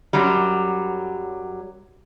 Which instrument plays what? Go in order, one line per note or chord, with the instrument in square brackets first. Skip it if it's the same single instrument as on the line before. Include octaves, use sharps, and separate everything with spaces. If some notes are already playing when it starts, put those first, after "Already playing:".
[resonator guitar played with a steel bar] F#2 F#3 G3